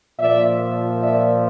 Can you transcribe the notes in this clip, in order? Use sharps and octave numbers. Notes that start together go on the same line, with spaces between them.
A#2 F3 D5 E5
D5 E5